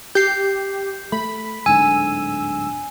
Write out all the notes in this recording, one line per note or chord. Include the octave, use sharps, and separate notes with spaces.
G4 G6 C7
A3 B5
D1 G#2 D3 G#5 E6